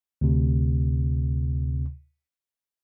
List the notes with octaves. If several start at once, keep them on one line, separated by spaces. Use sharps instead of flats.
D2 C3